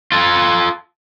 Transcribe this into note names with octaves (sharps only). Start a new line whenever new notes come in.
F4 A4